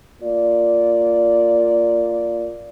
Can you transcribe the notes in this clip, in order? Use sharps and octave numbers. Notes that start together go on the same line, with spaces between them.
A#3 F4 D5